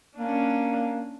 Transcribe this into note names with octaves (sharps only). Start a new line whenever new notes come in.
A#3 C#4 D4